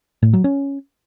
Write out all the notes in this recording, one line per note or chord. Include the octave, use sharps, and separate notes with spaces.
A2
F#3
C#4